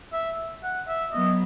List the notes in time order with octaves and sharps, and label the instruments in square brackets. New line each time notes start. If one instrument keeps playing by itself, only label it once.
[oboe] E5
F#5
E5
[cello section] F#3 B3 [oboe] D#5